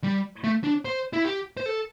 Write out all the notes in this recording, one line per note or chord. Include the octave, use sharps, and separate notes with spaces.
G3
A3
D4
C5
E4
G4
C5
A4